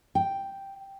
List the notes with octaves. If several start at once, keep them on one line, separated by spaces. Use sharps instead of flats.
G5